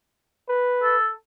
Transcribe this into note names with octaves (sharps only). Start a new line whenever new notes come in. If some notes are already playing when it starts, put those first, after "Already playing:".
B4
A4